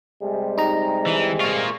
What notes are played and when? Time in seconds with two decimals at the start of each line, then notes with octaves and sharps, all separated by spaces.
0.23 C3 G3 G#3
0.58 D#4 A#5
1.06 E3
1.41 A#3 F4 C#6